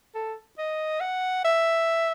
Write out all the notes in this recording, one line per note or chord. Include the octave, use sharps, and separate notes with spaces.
A4
D#5
F#5
E5